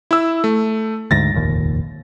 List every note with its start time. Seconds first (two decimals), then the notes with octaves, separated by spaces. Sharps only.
0.11 E4 E6
0.44 A3
1.11 D2 G#2 A6 A#6
1.34 F1 A#1 D#2